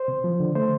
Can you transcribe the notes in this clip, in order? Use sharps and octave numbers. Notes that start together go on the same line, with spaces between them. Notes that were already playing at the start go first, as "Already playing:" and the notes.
Already playing: C5
C3
F3
D3
A3 C5